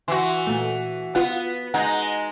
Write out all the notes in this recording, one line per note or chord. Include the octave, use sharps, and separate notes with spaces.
E3 F#4 C6
A#2 A3
B3 F4 F#5
G#3 D#4 F#5 F#6